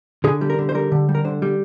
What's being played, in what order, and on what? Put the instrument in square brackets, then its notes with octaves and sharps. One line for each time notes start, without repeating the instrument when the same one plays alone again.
[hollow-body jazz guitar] D3 G#4
G3
A#4
D3
C5
G3 A#4
D3
G3
A#4
D3 C5
G3